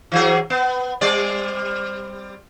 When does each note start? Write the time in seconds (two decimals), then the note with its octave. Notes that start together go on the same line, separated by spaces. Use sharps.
0.12 E3 F#3 G#4
0.50 B3
1.01 G3 C4 D5